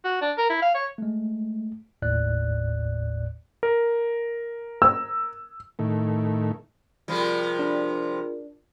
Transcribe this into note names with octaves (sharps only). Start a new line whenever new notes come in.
F#4
D4
A#4
E4
F5
C#5
G#3 A3
G1 D#2 A2 D5 F#6
A#4
E6
A2 D#3 A3
C3 F3 G3 F4 G#4 A#4
D4